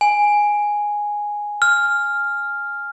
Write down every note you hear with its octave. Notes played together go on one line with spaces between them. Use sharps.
G#5
F6